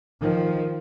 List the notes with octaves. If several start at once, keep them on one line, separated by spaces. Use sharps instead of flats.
D#3 F3